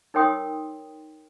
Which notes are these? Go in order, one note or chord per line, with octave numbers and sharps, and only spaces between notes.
D#4 A#4 C#5 G5 C6 D#6